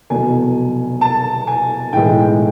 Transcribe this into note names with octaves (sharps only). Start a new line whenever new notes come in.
F1 E2 B2 F#3 G#5
A5
G#5
B1 A2 E3 G#3 G5